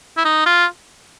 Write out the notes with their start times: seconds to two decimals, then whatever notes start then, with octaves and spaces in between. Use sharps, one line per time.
0.17 E4
0.25 D#4
0.46 F4